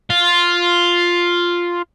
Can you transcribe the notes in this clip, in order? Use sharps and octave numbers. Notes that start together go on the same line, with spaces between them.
F4